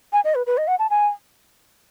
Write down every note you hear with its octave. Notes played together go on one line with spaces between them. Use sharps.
G#5
D#5
B4
B4
D#5
F#5
A5
G#5